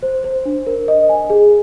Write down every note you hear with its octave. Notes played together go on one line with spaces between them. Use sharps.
C5
C5
D4
A#4
D#5
G#5
G#4